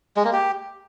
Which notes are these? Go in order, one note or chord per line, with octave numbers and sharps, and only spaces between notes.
G#3
A#3
G4